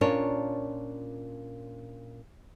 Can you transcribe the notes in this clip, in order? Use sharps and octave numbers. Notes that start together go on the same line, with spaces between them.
A#2 C#4 D4 F4 A#4 C#5